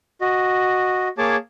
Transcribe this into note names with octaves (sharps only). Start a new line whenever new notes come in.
F#4 D#5
A#3 G#4 C#5 A5 D6